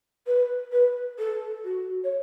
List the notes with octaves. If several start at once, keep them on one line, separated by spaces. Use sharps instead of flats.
B4
B4
A4
F#4
C#5